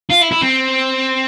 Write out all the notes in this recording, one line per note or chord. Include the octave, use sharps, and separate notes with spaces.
F4
E4
E4
C4